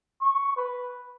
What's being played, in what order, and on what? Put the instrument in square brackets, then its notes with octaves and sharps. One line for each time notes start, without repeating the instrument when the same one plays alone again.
[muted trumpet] C#6
B4